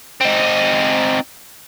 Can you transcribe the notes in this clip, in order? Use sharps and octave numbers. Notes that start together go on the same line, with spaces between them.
C4 D#4